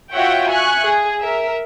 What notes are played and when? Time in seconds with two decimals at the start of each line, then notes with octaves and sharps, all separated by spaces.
0.13 F4 F#4 C#5 E5 F#5 G5
0.48 E5 G#5 C#6 F#6
0.85 G#4
1.21 A#4 E5